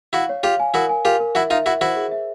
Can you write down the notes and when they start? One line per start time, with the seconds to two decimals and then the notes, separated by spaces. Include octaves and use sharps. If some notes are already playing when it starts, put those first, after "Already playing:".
0.13 E4 F#4 F5
0.29 C#5
0.43 F4 G4 F5
0.60 G#5
0.74 E4 F#4 A#4
0.89 G#5
1.05 F4 G4 A#4
1.20 A#4
1.35 E4 F#4 E5
1.50 D#4 F4 E5
1.66 E4 F#4 E5
1.81 E4 F#4 C5
1.96 G#4
2.11 E5